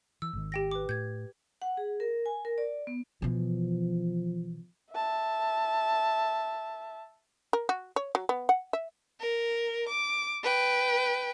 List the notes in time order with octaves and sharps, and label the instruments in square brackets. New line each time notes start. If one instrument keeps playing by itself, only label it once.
[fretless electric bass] E3 [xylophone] E6
[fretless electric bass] G#1 G#2 D#3
[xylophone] G4 G5 A#6
B4 D6
[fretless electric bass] A2 [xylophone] G6 G#6
[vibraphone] F#5
G#4
A#4
G#5
A#4
D5
B3
[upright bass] B2 E3 [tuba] F3
[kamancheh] E5 A5
[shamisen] A#4
F#4
C#5
F#3
B3
F#5
E5
[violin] A#4
D6
B4 G5